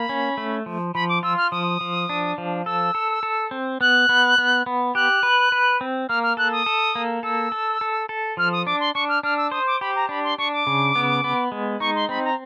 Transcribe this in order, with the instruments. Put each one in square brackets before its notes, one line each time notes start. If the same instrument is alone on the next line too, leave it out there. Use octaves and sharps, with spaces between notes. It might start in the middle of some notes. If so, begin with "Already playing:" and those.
Already playing: [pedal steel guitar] A#3 [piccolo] B5
[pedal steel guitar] C#4
A3
F3
[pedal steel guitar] F3 [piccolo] B5
[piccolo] D6
[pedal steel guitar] F4 [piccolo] E6
[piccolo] F6
[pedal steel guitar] F3 [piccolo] D#6
[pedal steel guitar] F3
D4
F3
[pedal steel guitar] A4 [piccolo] E6
[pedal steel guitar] A4
A4
C4
[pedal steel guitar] B3 [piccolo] F#6
[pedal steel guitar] B3
B3
B3
[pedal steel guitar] G4 [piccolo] F#6
[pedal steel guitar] B4
B4
C4
[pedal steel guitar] A#3 [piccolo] F6
[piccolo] F6
[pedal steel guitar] A4 [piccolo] F#6
[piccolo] D#6
[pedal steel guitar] A4
A#3
[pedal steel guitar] A4 [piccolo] E6
[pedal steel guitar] A4
A4
A4
[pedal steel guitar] F3 [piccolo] F6
[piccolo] D#6
[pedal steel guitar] D4 [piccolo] D6
[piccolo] C6
[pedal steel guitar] D4 [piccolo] C#6
[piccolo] F6
[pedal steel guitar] D4 [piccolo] F6
[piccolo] E6
[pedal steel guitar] C5 [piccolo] D#6
[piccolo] D6
[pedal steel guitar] G4 [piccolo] B5
[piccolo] A#5
[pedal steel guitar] D4 [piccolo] B5
[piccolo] C6
[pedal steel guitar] D4 [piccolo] C#6
[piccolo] D6
[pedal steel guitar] C#3
B3
B3
G#3
[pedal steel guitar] D#4 [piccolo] C#6
[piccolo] C6
[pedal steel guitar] C4 [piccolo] B5
[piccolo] A#5